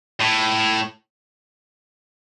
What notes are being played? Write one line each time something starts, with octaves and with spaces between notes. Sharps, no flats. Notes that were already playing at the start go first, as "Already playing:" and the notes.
A2